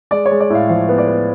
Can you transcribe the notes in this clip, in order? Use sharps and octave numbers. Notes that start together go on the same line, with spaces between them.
G#3 D5
C#5
G#3
D5
A2 F5
F3 F5
B3
D5
B3